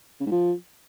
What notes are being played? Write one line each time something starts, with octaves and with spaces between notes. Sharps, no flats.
C#3
G#2
F3